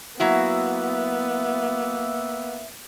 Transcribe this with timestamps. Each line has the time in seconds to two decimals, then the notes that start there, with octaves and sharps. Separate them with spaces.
0.20 F#3 A#3 B3 E4 F#4 E5